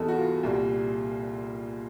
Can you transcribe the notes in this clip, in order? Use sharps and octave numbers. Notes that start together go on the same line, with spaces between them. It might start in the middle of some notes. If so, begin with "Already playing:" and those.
Already playing: E2 C3 E3 G3 A4 D#5
F#4
F4
C2 A#2 G3